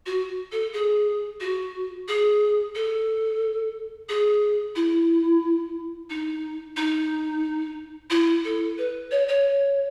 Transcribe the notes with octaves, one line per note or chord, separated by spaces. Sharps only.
F#4
A4
G#4
F#4
G#4
A4
G#4
E4
D#4
D#4
E4
A4
B4
C#5
C#5